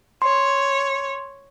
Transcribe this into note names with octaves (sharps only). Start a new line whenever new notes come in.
C#5 C6